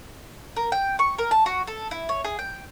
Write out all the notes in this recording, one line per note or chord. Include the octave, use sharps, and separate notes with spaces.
A#4
G5
C#6
A#4
A5
F#4
A4
E4
C#5
G#4
G5